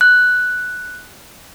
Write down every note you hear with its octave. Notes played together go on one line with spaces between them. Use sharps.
F#6